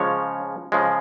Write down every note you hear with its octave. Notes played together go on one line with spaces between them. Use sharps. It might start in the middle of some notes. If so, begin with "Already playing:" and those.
Already playing: C#3 F3 G#3 C#5
C#3 F3 G#3